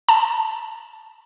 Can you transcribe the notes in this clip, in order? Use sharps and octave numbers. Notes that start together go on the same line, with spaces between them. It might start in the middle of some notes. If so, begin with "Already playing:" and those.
A5